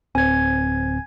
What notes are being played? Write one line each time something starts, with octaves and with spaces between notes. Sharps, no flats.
D1 C4 G#5 G#6